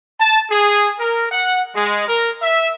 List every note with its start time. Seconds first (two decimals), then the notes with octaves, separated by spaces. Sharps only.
0.21 A5
0.51 G#4
0.99 A#4
1.32 F#5
1.75 G#3
2.08 A#4
2.42 E5